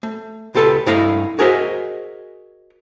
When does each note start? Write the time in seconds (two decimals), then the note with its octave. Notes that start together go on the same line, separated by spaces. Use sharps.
0.03 A3
0.55 C#2 F4 G4 A4 B4 A5
0.87 G2 A3 E4 D#5 F5 A#5
1.39 F#4 G#4 A#4 C5 D#5 E5